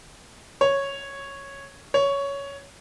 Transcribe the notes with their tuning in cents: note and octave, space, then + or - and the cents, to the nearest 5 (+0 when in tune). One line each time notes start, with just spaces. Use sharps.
C#5 -5
C#5 +10